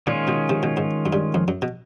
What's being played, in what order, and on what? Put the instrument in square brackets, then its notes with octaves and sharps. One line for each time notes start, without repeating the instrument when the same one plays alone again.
[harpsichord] A#2 [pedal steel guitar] D#3 G#3 C#4 F4
[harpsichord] B2
C3
B2
G#2
F#2
G2
F2
F#2
B2